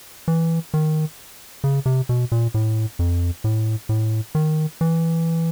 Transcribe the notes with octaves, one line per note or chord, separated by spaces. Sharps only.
E3
D#3
C#3
C3
B2
A#2
A2
F2
A2
A2
D#3
E3